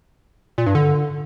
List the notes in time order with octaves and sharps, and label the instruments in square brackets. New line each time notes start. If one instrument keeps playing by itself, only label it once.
[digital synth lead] A#2
G2
D3